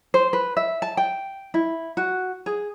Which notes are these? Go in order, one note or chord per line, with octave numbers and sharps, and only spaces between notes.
C5
B4
E5
A5
G5
E4
F#4
G#4